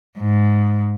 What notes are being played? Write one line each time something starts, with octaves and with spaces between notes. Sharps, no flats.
G#2